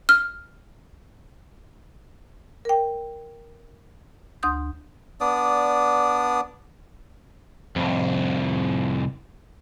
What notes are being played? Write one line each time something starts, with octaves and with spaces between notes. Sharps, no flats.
F6
A#4 G5
D2 C6 D#6 G6
B3 D4 D5 D#6
C2 F2